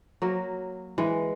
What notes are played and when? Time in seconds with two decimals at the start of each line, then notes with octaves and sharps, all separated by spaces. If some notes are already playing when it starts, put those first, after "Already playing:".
0.22 F#3 A#3
0.98 E3 G#3